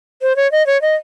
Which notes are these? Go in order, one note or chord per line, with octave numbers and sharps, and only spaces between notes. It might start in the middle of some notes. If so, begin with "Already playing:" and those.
C5
C#5
D#5
C#5
D#5